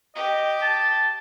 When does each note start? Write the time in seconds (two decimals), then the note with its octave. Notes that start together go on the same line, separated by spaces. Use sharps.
0.15 G4 D#5
0.62 A5